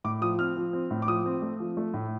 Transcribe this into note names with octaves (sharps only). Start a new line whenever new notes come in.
A2 D6
F3 D#6
C4 F6
F3
C4
A2
D6
F3 D#6
C4
A3
F3
A3
A2